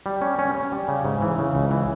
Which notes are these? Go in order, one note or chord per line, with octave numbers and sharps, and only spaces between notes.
G3
C#4
C#4
C#4
G3
C#3
G#2
E3
C#3
C#2
E3